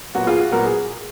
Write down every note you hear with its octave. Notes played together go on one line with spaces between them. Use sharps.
A#2 F#3 B3 F#4
F4 G#4
F#4
A#2 F#3 B3 F#4 A#4
G#4